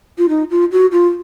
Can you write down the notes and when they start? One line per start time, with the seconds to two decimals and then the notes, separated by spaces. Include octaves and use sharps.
0.18 F4
0.29 D#4
0.50 F4
0.72 F#4
0.92 F4